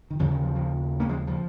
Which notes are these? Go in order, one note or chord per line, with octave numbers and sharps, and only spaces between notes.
D#3
D#2 C#3 F3
D#3
F3
F3
A#3 C#4
F3 G#3
F3